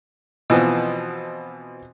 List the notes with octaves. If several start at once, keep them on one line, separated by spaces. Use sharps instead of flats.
B2 E3 F3 B3 C4